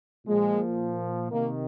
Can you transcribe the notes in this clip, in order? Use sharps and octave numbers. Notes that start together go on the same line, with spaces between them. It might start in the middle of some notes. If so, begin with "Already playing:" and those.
A#2 F3 G#3
C3 D#3 A#3